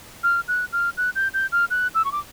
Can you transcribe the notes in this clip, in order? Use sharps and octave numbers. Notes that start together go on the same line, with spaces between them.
F6
F#6
F6
F#6
G6
G6
F6
F#6
E6
C#6
D6